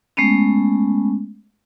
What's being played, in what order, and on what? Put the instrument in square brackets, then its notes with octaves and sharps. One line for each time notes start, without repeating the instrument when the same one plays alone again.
[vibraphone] G#3 A3 B3 C#4